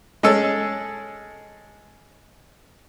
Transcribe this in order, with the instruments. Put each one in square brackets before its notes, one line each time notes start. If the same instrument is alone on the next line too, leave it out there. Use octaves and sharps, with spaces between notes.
[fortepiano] G#3 C#4 G#4 A4